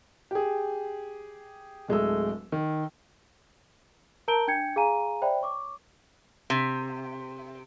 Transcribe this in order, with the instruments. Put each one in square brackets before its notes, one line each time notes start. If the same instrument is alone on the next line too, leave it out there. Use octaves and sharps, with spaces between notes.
[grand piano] G4 G#4
D1 G#3 A3 E6
D#3
[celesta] A#4 A5 A#5 G6 D7 G7
D4 G5 G6 G#6 C#7
G#4 F5 G#5 A#5 D#7
C5 D5 E5 G5 B5
C#5 C#6 D6
[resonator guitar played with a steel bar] C3